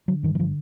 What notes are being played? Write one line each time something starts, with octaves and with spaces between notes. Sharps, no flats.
D3 F#3
G2 D#3
E3
D3 F3